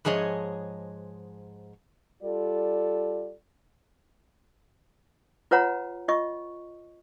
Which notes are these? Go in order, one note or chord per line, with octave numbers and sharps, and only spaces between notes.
G#2 F3 G#4 C#5 D#5
G3 F4 A4 D5
F4 B4 C#5 F#5 A#5
F4 D#5 C#6